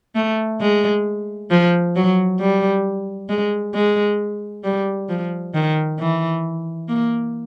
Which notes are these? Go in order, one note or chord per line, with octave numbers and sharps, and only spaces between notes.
A3
G#3
F3
F#3
G3
G#3
G#3
G3
F3
D#3
E3
A#3